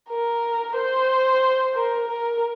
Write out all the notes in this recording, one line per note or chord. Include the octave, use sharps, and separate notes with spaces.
A#4
C5
A#4
A#4